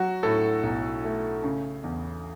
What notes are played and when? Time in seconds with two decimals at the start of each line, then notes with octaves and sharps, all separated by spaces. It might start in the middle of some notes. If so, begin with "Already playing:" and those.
Already playing: F#3 F#4
0.23 A2 A4
0.63 B1
1.04 A3
1.43 C#3
1.84 E2